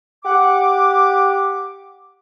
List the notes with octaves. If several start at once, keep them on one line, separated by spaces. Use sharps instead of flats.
G4 F#5 D6